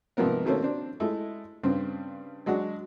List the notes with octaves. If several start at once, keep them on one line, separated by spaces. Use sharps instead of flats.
G#2 C3 F3 A#3 B3 A#4
B2 D#3 A3 A#3 C4 C#4
C4 D4
G#3 A3 E4
G2 C#3 C4
F#3 G#3 D4 F#4